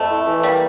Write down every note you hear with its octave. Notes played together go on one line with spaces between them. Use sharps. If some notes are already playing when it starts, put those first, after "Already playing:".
Already playing: F2 A3
E4
E3
G3 A#3